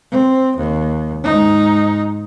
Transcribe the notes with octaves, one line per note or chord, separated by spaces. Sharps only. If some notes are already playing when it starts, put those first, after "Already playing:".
C4
D#2
G#2 D#4